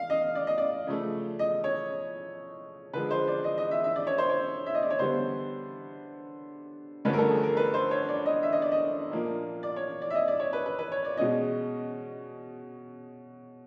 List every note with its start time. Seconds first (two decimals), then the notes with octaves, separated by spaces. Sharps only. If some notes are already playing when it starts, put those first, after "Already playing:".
Already playing: F5
0.10 D#5
0.35 D5
0.47 D#5
0.58 D5
0.87 C#3 F3 A3
1.39 D#5
1.64 C#5
2.93 D3 F3 G#3 B4
3.11 C5
3.28 D5
3.44 D#5
3.58 D#5
3.71 E5
3.84 E5
3.96 D5
4.07 C#5
4.18 C5
4.29 C#5
4.66 E5
4.75 D#5
4.83 D5
4.90 C#5
4.99 D3 G3 B3 C5
7.05 G2 D3 F3 A3 C#4 B4
7.13 A#4
7.18 A4
7.31 G#4
7.43 A#4
7.57 B4
7.74 C5
7.91 C#5
8.08 D5
8.26 D#5
8.43 E5
8.53 D#5
8.62 D5
8.72 D#5
9.11 A#2 F3 A#3 D4
9.63 D5
9.76 C#5
10.02 D5
10.10 E5
10.15 D#5
10.28 D5
10.40 C#5
10.53 B4
10.66 B4
10.79 B4
10.92 C#5
11.05 D5
11.17 B2 G#3 C#4 D#5